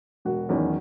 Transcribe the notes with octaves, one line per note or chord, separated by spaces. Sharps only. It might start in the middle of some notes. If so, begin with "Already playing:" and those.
E1 F#4
E2 D#3 F#3 C#4